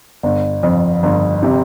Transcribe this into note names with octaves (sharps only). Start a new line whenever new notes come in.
G1
F2
G1
C3